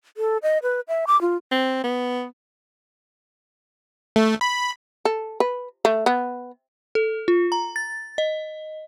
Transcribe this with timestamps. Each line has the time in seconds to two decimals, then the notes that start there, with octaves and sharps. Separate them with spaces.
0.17 A4
0.43 D#5
0.63 B4
0.88 E5
1.07 D6
1.21 F4
1.52 C4
1.84 B3
4.16 A3
4.41 B5
5.05 A4
5.40 B4
5.85 A3
6.06 B3
6.95 A4
7.28 F4
7.52 A#5
7.76 A6
8.18 D#5